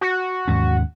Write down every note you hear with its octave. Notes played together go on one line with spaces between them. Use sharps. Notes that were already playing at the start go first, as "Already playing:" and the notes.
F#4
D#2 G#2 C#4